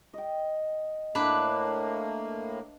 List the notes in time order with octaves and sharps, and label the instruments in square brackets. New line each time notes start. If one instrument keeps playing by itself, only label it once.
[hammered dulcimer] D#5 G5
[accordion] A2 A#3 [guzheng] D4 B4